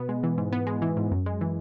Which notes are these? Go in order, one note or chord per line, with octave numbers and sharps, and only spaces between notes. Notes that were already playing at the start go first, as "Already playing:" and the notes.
Already playing: B2 B3
G#3
E3
G#2
B3
G#3
E3
G#2
F#2
G#3
E3